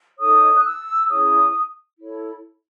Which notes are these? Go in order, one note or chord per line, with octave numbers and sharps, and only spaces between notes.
D#4 A4 C#5 D#6
F#6
E6
C#4 E4 G#4 C#5 D#6
E4 A4 C#5